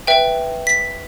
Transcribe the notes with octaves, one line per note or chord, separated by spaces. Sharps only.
B4 E5 G5
B6